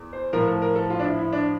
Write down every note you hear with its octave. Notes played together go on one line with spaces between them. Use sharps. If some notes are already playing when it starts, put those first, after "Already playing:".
Already playing: E2
C5
A2 F3 A#4
A4
A#4
A4
F4
D4
E4
E4
D4